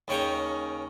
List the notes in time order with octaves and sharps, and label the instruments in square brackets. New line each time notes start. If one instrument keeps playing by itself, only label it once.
[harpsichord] D#2 C#3 C#5 G5 A#5